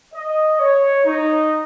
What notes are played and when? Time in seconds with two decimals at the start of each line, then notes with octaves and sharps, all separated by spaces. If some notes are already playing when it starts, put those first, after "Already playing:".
0.14 D#5
0.59 C#5
1.04 D#4